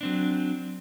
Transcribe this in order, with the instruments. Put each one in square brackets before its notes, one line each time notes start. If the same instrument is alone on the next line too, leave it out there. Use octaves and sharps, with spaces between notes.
[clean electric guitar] F#3 C4 D4